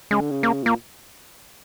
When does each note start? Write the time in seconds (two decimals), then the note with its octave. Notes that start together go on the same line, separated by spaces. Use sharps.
0.11 C#3 G#3
0.21 D3
0.31 C#3
0.43 A#3
0.64 A#2 A#3